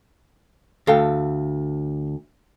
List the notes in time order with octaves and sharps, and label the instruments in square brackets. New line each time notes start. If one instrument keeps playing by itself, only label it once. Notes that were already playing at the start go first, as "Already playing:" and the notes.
[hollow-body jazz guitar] D2 [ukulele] A4 F5 G5